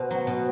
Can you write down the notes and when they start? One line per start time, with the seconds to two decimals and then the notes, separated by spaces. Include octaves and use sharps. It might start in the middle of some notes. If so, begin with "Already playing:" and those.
Already playing: B2 C5
0.10 F#3
0.27 B2